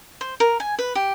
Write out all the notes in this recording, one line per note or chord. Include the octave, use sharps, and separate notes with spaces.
C5
A#4
G#5
B4
G4